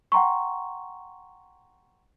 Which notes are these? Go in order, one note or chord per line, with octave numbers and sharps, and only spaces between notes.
F#5 G5 A#5 C6 C#6